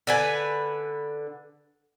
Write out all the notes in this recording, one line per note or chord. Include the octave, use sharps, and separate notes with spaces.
D3 B4 G#5